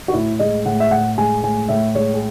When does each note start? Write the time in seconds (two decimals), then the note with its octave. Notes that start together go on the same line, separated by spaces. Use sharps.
0.08 F#4
0.13 A2 E4
0.39 G#3 D#5
0.65 A2 F#5
0.80 E5
0.91 A2 F#5
1.18 G#3 G#5
1.43 A2 G#5
1.68 A2 E5
1.95 G#3 C#5
2.14 G#4